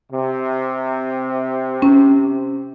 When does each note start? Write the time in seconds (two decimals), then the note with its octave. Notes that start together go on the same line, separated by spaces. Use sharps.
0.11 C3
1.82 C#4